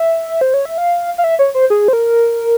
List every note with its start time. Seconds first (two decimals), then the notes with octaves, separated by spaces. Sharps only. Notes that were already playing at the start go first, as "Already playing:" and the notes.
Already playing: E5
0.41 C5
0.54 C#5
0.65 E5
0.78 F5
1.18 F5
1.24 E5
1.39 C#5
1.55 C5
1.70 G#4
1.88 C5
1.93 A#4